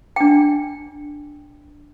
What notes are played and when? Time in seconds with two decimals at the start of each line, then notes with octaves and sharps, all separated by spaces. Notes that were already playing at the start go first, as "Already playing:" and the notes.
0.16 D4 G5